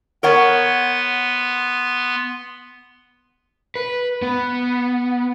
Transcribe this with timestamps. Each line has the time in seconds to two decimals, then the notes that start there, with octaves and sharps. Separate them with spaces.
0.23 B3 A#4 C#5 F#5 C6
3.76 B4
4.22 B3